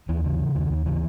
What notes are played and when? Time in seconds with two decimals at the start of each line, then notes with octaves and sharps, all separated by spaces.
0.08 D#2 E3
0.24 C#3 E3
0.39 C#3
0.55 D#2 D#3
0.70 D#2
0.86 C#3 E3